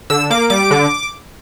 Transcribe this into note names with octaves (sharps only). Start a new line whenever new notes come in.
D3 E6
A#3 D6
G3 D6
D3